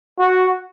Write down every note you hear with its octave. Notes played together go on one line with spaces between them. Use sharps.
F#4